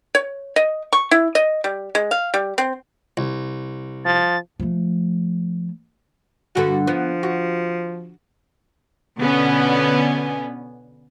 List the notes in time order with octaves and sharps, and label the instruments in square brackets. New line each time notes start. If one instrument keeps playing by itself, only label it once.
[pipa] C#5
D#5
C#6
E4
D#5
G3
G#3
F5
G3
C4
[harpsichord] C2
[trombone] F3 [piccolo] A6
[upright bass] F3 A3
[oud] G2 D3 A4 [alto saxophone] F#4
[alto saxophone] F3 [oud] B3
[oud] F#4
[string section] B2 D3 B3 C#4